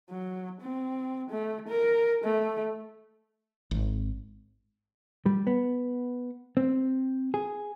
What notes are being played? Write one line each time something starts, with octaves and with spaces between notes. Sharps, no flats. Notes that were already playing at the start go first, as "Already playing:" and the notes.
F#3
C4
A3
A#4
A3
G#1
G3
B3
C4
G#4